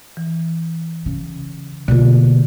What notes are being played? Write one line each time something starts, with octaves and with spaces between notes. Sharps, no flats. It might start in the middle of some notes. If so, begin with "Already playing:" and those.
E3
C#3
B2 D3 A#3 F4